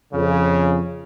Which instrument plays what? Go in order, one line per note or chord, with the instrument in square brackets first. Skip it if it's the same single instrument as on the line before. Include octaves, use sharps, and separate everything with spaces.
[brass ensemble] F2 C#3